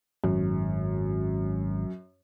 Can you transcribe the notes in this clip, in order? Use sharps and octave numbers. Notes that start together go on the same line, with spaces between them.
G#1 F#2